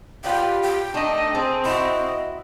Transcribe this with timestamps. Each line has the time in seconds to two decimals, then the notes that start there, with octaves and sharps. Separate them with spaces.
0.24 F4 G4 B4 D5 G5
0.63 G5
0.94 A3 D4 D#4 D#5
1.35 C4 G#4 A4
1.65 E4 F#4 D#5